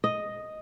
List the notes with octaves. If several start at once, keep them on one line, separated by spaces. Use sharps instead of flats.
D#5